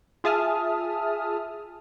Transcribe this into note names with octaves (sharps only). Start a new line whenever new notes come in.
F4 G#4 E5 A5 D#6 F6